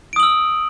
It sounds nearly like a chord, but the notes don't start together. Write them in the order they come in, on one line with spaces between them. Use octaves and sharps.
D7 D#6 F#7 E6